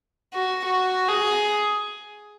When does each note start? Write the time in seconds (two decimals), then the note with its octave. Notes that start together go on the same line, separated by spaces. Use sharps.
0.33 F#4
0.65 F#4
1.08 G#4